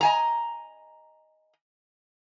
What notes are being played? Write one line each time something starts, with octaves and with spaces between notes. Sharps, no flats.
D#5 G#5 A#5